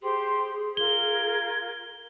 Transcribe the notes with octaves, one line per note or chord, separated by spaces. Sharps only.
G4 G#4 C5 C6
F4 A#4 G#6 G7